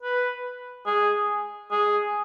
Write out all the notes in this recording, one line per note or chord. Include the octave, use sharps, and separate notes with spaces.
B4
G#4
G#4